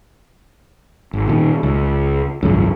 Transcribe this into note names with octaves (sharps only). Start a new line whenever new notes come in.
G#1
A#2 D#3
C#2
G#1 C#2 F#2